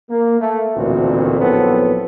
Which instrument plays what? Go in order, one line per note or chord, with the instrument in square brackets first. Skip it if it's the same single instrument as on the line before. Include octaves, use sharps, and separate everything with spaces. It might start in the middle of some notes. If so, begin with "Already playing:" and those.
[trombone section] A#3
A3
A1 D2 A#2 D#3 C4 F#4
A#1 F#3 B3 C4 E4 A4